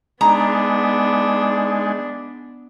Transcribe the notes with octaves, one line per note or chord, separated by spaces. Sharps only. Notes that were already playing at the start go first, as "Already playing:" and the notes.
G#3 B3 D4 D#4 A#5